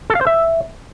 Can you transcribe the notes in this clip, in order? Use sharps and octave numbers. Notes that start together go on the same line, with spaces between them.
A4
F5
C5
E5